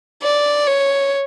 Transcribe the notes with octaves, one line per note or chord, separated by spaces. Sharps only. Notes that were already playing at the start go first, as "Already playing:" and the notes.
D5
C#5